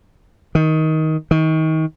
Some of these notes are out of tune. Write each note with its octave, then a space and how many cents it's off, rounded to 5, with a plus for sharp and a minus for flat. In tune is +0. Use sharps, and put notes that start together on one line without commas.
D#3 +15
D#3 +30